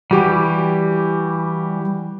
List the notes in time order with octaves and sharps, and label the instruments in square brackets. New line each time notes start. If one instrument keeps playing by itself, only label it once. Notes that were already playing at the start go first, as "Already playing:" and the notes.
[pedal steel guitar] E3 G3 [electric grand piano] F#4 G4